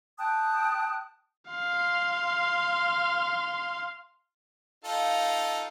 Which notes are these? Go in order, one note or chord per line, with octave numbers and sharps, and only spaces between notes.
G5 A5 D#6 F#6
F5 C6
D#4 F4 A4 F5 G5